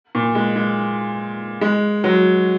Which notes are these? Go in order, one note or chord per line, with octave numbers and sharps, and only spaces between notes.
A#2
G#3
G#3
G#3
F#3